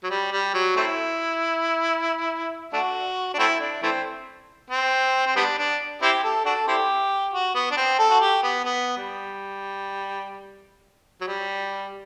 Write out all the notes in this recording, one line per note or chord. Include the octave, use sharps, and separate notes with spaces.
F#3
G3
G3
F#3
A3 C4 E4
A3 D4 F#4
D4
A3 C4 E4
D4
E3 A3 C4
C4
C4
G3 B3 D4
D4
C4 E4 G4
A4
D4 F#4 A4
C4 E4 G4
F#4
B3
D4
C4
A4
F#4
G4
B3
B3
G3
F#3
G3